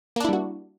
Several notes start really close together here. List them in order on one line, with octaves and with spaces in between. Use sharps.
A#3 D4 E4 G3 F#4